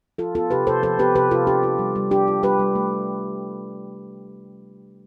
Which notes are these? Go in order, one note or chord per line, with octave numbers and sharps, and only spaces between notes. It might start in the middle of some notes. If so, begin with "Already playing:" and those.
F3 F4 A4
B3 F4 A4
C3 G4 B4
C3 A4 C5
F3 A4 C5
B3 G4 B4
C3 G4 B4
C3 F4 A4
D4 G4
F4
G3
G3
D4 G4
F4
G3 G4 B4
G3
A3